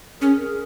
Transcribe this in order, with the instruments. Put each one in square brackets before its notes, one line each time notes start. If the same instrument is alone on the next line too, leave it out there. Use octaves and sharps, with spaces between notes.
[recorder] C#4 [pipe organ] G#4 A#4